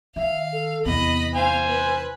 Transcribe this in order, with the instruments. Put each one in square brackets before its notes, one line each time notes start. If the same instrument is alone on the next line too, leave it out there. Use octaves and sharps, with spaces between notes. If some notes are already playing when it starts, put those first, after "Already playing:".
[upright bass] D#3 [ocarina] E5 [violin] F5
[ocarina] A4
[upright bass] E2 C3 [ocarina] B3 [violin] D#5 B5
[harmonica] C5 G#5 [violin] F5
[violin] B4